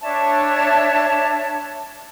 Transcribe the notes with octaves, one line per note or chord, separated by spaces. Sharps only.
D4 C#5 E5 A5